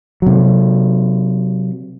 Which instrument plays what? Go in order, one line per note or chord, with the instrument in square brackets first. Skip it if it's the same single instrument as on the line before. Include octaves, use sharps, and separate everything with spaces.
[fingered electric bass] C3 F#3